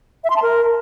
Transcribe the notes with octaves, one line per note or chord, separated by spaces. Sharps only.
E5
C6
A5
A#4